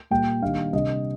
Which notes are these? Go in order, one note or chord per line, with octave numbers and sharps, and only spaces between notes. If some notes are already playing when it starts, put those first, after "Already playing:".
A#2 G3 A#3 G5
D#3 G3 A#3 D4 F5
C3 G3 D4 D#5